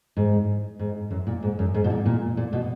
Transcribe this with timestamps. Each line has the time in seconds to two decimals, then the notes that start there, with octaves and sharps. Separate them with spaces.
0.17 G#2
0.79 G#2
1.11 F#2
1.27 A#2
1.43 G#2
1.59 F#2
1.74 G#2
1.84 B2
1.90 A#2
2.06 A#2
2.37 A#2
2.53 B2